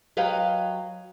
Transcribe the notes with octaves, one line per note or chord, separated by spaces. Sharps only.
F#3 B4 D#5 F5 G5